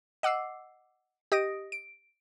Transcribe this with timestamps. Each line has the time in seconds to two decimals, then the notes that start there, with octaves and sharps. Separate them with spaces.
0.23 D#5 F#5 D6 E6 C7
1.32 G4 D#5 D#6 A#6 D7
1.72 D7